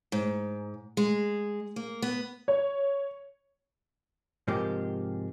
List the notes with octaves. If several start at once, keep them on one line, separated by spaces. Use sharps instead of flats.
G#2
G#3
A#3
B3
C#5
G#2 C3 F3 G#3 A#3 G4